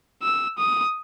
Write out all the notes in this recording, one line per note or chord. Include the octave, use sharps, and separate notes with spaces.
E6
D#6